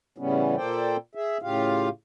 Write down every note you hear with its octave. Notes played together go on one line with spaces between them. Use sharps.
A2 C#3 E3 G3 B3 C#4
A#2 A#3 A4 C5 D5 G5
G#4 E5
A2 C#3 F4 G4 F5